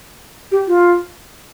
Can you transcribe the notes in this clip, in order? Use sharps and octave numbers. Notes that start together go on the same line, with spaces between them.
G4
F4